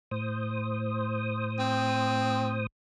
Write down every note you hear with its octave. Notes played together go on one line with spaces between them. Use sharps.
A2 C5 D#6
C4